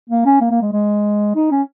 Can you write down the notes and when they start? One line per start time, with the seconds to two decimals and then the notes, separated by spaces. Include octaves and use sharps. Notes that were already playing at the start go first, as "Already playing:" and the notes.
0.10 A#3
0.26 C#4
0.41 A#3
0.51 A#3
0.62 G#3
0.73 G#3
1.35 D#4
1.51 C#4